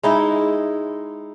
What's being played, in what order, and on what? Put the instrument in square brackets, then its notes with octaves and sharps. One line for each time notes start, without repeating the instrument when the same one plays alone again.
[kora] G#3 D#4 E4